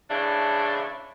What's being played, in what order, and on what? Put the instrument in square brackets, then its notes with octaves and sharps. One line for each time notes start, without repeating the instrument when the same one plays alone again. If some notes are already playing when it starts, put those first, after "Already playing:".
[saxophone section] A2 C#3 E3 D4